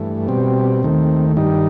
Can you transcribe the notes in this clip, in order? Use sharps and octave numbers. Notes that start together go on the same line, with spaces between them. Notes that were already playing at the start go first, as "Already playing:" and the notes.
Already playing: G2 E3 A3
B2 G3 C4
D#2 D#3 A3
G2 D#3 G3 D#4